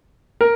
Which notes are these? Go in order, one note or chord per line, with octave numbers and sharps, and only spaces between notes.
A#4